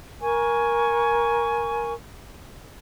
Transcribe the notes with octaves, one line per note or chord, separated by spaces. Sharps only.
A#4 G#5 C#6